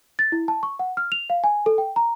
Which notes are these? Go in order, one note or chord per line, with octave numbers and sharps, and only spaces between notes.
A6
E4
A5
C#6
F#5
F6
F7
F5
G#5
A4
G5
A#5